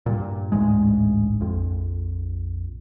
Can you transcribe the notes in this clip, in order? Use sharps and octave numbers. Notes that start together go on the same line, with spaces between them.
G2 A#2
A1 D2 G#2 G#3
A#1 F2